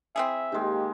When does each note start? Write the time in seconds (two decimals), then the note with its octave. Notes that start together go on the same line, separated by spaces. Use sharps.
0.16 C4 E4 G#4 E5
0.52 D#3 G#3 A#3 G4